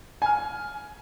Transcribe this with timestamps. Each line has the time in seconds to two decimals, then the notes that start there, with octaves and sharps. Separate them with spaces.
0.22 G#5 F6